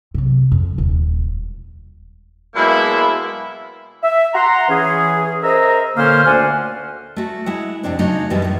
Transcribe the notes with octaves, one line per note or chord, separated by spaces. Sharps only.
C3 F#3
F2
D#1 G#3
B2 F#3 G#3 A#3 E4
E5
F#5 A#5 C6
E3 C#4 G#4
A#4 C5 D#5 E5 A#5
A#2 D3 A#3 C#4 C5 F6
D2 A3 C5 D5 F#5 G#5
A3 F#4
G#3 E4 F#5
F2 C3 C4 D4 C5
C#3 F#3 G#3 A3 D4 D#4
F#2 B2 E3 G3 G#3 B4
F#2 A2